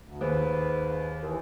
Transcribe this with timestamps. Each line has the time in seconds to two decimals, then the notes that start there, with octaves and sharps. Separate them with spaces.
0.03 D2
0.21 D#2 G#2 B4
1.22 D#2 E3